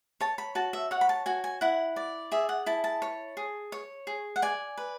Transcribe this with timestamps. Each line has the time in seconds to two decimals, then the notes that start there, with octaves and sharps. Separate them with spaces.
0.21 C#5 A5
0.38 B5
0.55 F#4 A5
0.73 E5
0.91 C#5 F#5
1.01 B5
1.09 A5
1.26 F#4 G#5
1.44 G#5
1.61 E4 F#5
1.96 D5
2.32 G#4 E5
2.49 F#5
2.66 E4 A5
2.84 A5
3.02 C#5
3.37 G#4
3.72 C#5
4.07 G#4
4.36 F#5
4.42 D5 G#5
4.78 B4